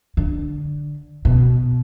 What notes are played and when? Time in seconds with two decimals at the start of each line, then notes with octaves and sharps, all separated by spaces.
0.17 D3
1.25 B2